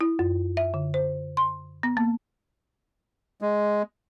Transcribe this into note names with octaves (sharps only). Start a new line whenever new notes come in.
E4
F#2
E5
D3
C5
C6
B3
A#3
G#3